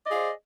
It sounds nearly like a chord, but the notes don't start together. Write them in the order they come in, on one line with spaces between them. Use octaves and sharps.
D#5 D5 G#4 F5 C5